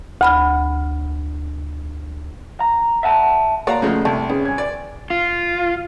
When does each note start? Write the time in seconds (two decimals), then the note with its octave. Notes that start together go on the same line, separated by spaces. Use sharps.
0.21 D2 B5 F6
2.60 A#5
3.03 E5 F#5 A5
3.67 A#3 F#4 C#5 D5 F5 A#5
3.82 C#3 F3 G#3 A3
4.05 C2 A3 A5
4.30 B3 C#4 G#4 C#5
4.45 G#5 G#6
4.58 D5
5.10 F4